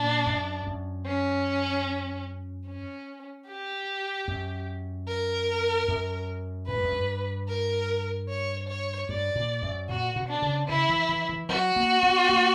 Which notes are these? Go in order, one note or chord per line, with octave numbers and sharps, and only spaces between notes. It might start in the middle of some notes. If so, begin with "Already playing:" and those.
Already playing: A#2 D4
F#2
F#2
C#4
C#4
G4
F#2
A#4
F#2
A#2 B4
G2
F#2
G2
A#4
C#5
C#5
G2 D5
A#2
F#2
A#2 F#4
B2
D4
C#3
C#3 E4
E3
E3
E3
F#3 F#4
A#3
B3
A#3